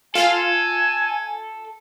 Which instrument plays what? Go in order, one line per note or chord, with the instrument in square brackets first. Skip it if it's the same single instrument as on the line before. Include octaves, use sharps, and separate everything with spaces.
[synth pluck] F4 F5 [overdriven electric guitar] A4 [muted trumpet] G#5